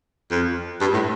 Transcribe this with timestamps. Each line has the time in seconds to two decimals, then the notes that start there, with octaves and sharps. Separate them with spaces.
0.31 F2
0.81 G2
0.94 A2